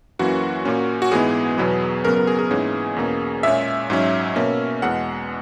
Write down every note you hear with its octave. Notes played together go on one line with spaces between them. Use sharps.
F#2 E3 A#3 C#4 F#4
A#2 A#3 C#4
F#4
G#2 E3 G#3 B3 G#4
E2 B2 F#3 B3
F#2 C#3 F#3 B3 A#4
A#4
G#4
G#4
G#2 E3 A#3 C#4 G#4
E2 B2 A#3 C#4
A#2 G#3 C#4 E5
G#2 F#3 C#4
B2 A#3 C#4
E2 B2 G#3 F#5